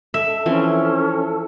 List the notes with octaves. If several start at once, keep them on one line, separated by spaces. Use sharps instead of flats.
A4 E5
E3 F3 C4 C#4